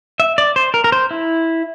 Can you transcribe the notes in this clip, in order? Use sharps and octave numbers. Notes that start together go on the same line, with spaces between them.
E5
D5
C5
A#4
A#4
C5
E4